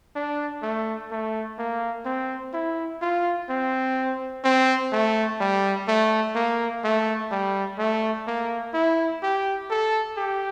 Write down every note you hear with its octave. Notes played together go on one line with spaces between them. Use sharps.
D4
A3
A3
A#3
C4
E4
F4
C4
C4
A3
G3
A3
A#3
A3
G3
A3
A#3
E4
G4
A4
G4